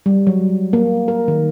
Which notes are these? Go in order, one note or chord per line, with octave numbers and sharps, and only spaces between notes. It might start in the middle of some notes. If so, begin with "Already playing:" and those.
G3
F#3
A#3
A#4
D#3